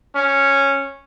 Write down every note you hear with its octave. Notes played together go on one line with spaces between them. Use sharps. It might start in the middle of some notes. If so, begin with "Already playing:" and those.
C#4